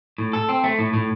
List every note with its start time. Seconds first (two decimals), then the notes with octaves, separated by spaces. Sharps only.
0.18 A2
0.33 A4
0.49 C4
0.64 A3
0.79 A2
0.94 A2